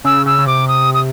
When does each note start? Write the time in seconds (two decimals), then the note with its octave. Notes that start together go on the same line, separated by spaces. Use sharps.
0.04 C#3 E6
0.26 C#3 E6
0.38 C#3
0.47 C3 D6
0.68 D#6
0.94 D#6